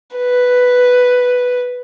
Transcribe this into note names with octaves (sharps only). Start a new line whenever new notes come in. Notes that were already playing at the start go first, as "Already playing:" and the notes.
B4